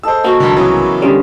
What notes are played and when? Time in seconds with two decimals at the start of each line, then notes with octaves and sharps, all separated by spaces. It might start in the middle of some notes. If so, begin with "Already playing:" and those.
0.03 G#4 A4 C5 D#5 E6
0.24 A#3 F#4 A#4
0.40 C2 F2 D3
0.56 C#3 E3 F#3 B3
1.02 D3 G3 C#4 F4 G#4